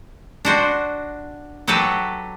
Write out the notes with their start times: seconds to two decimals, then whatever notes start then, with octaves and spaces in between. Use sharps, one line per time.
0.45 D4 F#4 C5
1.67 F#3 F#4 G4 A4 B4